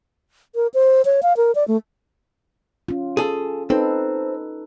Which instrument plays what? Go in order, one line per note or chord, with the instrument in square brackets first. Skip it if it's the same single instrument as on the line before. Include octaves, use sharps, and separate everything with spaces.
[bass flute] A#4
C5
C#5
F5
A#4
D5
A3
[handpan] C#4 F4
[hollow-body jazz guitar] G#4 A4
[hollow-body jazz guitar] C4 [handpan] D#4 A4 B4